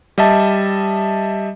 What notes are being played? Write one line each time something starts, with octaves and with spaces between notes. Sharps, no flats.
G3 D#5 E5 A5